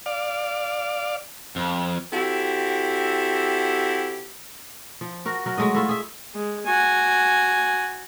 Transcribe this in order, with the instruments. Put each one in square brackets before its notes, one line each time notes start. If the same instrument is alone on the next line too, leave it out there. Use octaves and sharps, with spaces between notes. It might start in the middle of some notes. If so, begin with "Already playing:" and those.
[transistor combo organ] D5 F5
[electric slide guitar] F2
[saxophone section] C4 E4 F#4 G4 A4
[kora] F3
F#4 A#4
F#3 A#4
F#3 G#3 A3 D#5
A3 E4 F4
G#4 E5
[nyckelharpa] G#3
F#4 G#5